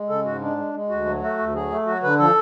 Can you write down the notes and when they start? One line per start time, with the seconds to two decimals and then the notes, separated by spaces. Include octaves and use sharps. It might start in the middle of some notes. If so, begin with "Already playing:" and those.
Already playing: G#3
0.09 C#3 A4
0.25 G#2 F#4
0.42 G#3 D4
0.58 G#3
0.74 G#3
0.89 D2 F#4
1.06 F#3
1.22 A3 F#4
1.38 D2
1.54 F#3 G#4
1.71 A3
1.86 F#3 F#4
2.03 D3 B4
2.19 F3 A4